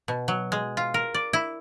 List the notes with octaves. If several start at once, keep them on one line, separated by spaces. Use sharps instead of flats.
B2
F#3
G#3
F4
A#4
D5
E4